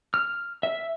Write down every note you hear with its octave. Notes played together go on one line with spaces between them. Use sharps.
F6
E5